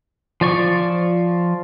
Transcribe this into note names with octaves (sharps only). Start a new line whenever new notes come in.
F3 D5 C#6